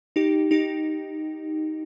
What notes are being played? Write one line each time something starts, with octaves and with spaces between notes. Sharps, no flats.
D#4 G4
D#4 G4